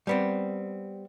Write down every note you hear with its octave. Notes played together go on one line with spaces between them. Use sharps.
G3 B3 C4